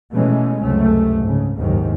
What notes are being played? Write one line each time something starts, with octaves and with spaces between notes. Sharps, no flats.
B2 E3 G#3 A3 C#4
C#2 F#2 C3 A3
G#2 C#3
F#1 D#2 G#2 D#3